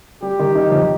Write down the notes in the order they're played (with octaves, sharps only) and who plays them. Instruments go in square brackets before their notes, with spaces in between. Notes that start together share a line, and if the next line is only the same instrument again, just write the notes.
[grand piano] G3 [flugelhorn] G4
[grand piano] D#3
D#4
F2